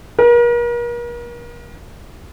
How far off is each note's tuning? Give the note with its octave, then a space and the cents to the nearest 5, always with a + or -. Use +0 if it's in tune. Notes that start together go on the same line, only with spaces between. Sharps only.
A#4 +40